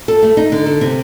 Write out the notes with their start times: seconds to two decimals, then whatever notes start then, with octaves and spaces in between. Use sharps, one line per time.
0.08 A4
0.23 A3
0.37 D#4
0.52 D3
0.66 A4
0.81 C3